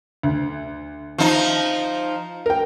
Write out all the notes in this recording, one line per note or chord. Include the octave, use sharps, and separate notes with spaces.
D2
F3 D#4
A#4 G5